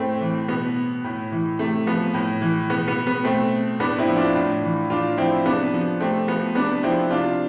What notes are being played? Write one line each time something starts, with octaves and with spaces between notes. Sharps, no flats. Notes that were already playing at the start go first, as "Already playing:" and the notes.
Already playing: A2 A3 C4
E3
B2 B3
A2
E3
C3 A3
F3 B3
A2
E3
B2 B3
B3
B3
B2 A3 C4
A2 B3 D4
C4 E4
F3
D4 F4
A2
E3
A2 D4 F4
F3 C4 E4
C3 B3 D4
F3
C3 A3 C4
F3 B3
C3 B3 D4
F3 C4 E4
C3 D4 F4